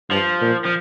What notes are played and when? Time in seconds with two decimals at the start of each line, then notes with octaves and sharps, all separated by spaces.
0.10 G2 F3
0.42 A#2
0.65 F3